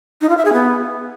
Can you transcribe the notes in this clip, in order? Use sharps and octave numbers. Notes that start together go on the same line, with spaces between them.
D#4
F4
E5
G#4
B3